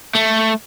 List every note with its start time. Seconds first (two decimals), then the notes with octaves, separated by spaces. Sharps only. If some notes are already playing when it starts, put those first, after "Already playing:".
0.15 A3